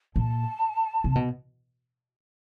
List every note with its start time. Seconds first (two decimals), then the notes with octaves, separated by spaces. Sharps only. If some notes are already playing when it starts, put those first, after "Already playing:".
0.15 A#2 A5
1.04 C3
1.15 B2